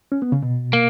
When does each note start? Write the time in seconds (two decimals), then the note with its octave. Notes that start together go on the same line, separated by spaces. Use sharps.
0.12 C#4
0.22 B3
0.32 C#3
0.42 B2
0.73 A#3